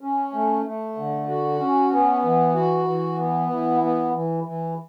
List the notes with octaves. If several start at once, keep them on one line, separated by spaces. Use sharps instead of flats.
C#4
A3
A3
D3
F#4
C#4
B3
E3
F#4
E3
B3
E3
B3
E3
E3